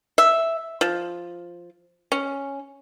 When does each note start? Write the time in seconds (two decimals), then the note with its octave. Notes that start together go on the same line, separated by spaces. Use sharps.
0.18 E5
0.81 F3
2.12 C#4